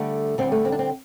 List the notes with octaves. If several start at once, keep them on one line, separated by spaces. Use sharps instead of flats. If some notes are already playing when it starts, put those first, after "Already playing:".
Already playing: D3 G3 A3
D3 G3 C4
A3
C4
D4
C4